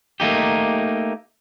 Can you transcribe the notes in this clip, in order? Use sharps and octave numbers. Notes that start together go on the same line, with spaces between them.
A3 A#3 D#4 G4